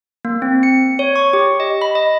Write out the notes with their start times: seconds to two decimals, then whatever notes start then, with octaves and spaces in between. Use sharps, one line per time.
0.25 A#3
0.42 C4
0.63 C#7
0.99 C#5
1.16 C#6
1.33 G4
1.60 D#5
1.82 B5
1.95 D#5